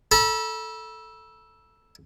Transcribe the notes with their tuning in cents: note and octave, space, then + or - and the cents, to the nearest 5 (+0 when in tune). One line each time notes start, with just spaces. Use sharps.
A4 +0 B5 -40